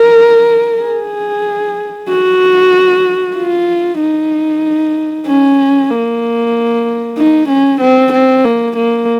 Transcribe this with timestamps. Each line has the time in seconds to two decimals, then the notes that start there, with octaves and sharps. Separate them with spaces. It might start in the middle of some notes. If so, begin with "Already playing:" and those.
Already playing: A#4
0.82 G#4
2.09 F#4
3.36 F4
4.00 D#4
5.26 C#4
5.90 A#3
7.18 D#4
7.49 C#4
7.80 C4
8.13 C4
8.44 A#3
8.76 A#3